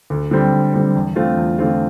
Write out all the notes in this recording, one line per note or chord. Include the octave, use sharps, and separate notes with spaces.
D2
D3 G3 C4
D2
D3 G3 C4
E2
D3 A3 C4 F4
E2
D3 A3 C4 F4